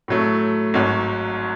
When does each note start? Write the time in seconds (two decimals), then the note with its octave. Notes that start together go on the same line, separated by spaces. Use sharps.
0.08 A2 F#3 A3
0.74 G#1 G#2 F#3